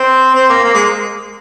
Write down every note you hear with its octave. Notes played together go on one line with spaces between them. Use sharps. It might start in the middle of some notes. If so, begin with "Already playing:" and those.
Already playing: C4
C4
A#3
A#3
G#3